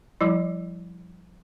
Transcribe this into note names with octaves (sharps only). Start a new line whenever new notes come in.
F3 G3 E4